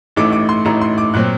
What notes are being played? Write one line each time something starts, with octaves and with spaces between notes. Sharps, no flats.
A1 A2 A3 D#4 D6
D6
C6
A1 A2 A3 D#4 A#5
C6
D6
A#2 F#3 C4 F#6